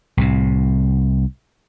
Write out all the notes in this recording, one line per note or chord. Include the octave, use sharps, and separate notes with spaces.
C2 A2 C3